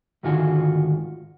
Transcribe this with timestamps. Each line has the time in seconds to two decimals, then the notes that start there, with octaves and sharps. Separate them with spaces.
0.23 D2 G#2 D#3 F4 F#4 G#5